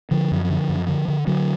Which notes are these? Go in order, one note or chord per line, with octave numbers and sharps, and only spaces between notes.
D3 F3
F#2
D3
F#2
D3
D3
D3 F#3